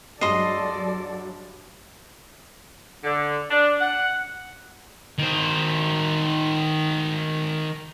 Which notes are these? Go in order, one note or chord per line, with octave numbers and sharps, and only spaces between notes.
G2 F#3 G#3 A4 D5 D#5 C6 C7
D3
D4
F#5
D#3 C5